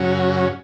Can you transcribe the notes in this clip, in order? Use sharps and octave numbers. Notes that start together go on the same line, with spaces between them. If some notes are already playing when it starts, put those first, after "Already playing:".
Already playing: F#2 C#3 F#3 C#4